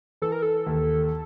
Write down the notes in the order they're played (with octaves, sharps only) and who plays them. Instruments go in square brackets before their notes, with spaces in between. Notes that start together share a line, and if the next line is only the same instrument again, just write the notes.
[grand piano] E3 [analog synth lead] A4
[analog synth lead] A#4
A4
[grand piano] D#2